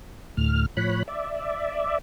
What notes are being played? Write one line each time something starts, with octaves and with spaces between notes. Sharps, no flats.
D2 A2 F6
A2 F3 C#5 B5 F#6
D5 E5